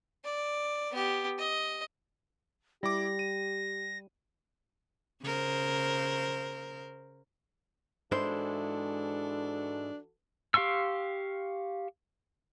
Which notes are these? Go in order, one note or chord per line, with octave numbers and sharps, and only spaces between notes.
D5
B3 G4
D#5
G3 E4 G4 D6 A#6
D#7
C#3 A#4 C5
G#2 E3 G#3 D4 E4 F#4 A4 C5
G4 F5 C6 C#6 E6